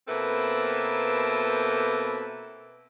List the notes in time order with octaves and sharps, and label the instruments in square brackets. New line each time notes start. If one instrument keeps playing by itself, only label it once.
[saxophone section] B2 A#3 C4 E4 A4 B4